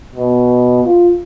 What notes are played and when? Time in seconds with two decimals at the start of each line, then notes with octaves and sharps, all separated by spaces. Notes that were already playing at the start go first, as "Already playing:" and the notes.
0.15 B2
0.85 F4